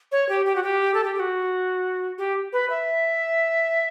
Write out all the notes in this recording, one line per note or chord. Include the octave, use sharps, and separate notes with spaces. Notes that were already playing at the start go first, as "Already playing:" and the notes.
C#5
G4
G4
F#4
G4
A4
G4
G4
F#4
G4
B4
E5